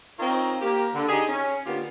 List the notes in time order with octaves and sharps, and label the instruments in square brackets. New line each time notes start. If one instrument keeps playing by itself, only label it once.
[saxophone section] C4 D#4 F4 A#4 C#5
A#3 G4
D3
D#4 G4 G#4
C#4
D3 A#3 B3 F4 G4